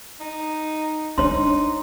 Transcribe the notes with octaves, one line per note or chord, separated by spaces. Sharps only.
D#4
D4 D#4 C#5 C6